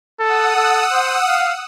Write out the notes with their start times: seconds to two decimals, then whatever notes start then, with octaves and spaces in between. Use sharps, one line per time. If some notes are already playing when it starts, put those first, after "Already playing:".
0.20 A4 F#5 D#6 E6
0.56 A4
0.92 C5
1.27 F5